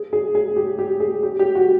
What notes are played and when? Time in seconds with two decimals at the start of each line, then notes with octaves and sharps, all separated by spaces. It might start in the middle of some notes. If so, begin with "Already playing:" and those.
Already playing: G#4
0.13 G#4
0.35 G#4
0.56 G4
0.79 G4
1.00 G#4
1.23 G4
1.39 G4
1.55 F#4